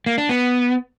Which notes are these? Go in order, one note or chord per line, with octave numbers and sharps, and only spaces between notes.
A#3
D4
B3